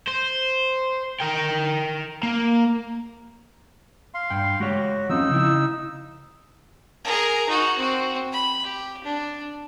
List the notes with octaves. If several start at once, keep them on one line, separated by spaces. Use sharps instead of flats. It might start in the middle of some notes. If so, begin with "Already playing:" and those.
C5
A#4 G5
A#3
F5 C6
G2 G5
G#3 F#4 G4 C#5
F3 C4 C#4 D#4 E6
C#3 E4
G#4 A#4
D#4 F#4
C4 F#4
B5
G4
D4